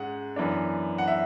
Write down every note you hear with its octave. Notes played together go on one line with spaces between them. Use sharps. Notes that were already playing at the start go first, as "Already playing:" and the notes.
Already playing: G#2 G#3 C#4 F#5
F#2 E3 B3 D4
F#5
E5